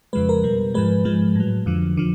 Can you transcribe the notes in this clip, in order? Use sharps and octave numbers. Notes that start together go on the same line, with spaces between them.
F2 C#3 F3 G#3 B4
A#4
B2 G3
G#2 F3 G#3 B4
G#2 F3 G#3
A2 F#3
F2 D3 F3
D3 F3